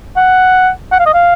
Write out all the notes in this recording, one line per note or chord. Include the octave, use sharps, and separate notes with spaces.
F#5
F#5
F5
D#5
F5